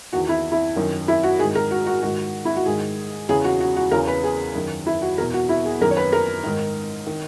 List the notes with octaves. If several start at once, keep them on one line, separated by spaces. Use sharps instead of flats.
E2 D#3 F#4
E4
E4
F#2 D#3
E4
F#4
G#2 D#3 G#4
A#4
F#4
F#4
G#2 D#3 F#4
E4
F#4
G#2 D#3 G#4
E2 C#3 E3 G#4
F#4
F#4
F#4
E2 C#3 E3 A#4
B4
G#4
F#2 D#3
E4
F#4
E2 B2 A#4
F#4
E4
G#4
F#2 D#3 A#4
C#5
B4
A#4
G#2 D#3
D#3